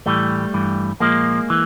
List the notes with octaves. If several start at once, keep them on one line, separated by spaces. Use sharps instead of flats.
A2 E3 G3 A3
G2 E3
A#2 F3 G#3 A#3
E3